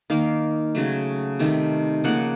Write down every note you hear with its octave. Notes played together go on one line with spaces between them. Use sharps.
D#3 A#3 F5
C#3 F#3 A3
C3 D#3 A3
C#3 F3 A#3 F#5